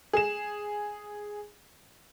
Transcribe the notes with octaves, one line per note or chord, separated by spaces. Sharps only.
G#4 E7